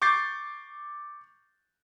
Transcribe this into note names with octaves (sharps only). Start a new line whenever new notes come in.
C#6 D6 G6 A6 C7